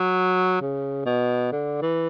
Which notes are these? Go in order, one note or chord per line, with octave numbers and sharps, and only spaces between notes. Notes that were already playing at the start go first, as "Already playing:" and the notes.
Already playing: F#3
C#3
B2
D3
E3